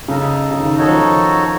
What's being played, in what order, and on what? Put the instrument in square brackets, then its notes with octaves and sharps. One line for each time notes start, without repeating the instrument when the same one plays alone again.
[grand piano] C#3 [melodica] D#4 A4 D#5
[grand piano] C#3
D#3
[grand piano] D#3 [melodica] D#4 F#4 A4 C#5
[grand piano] F3
D#3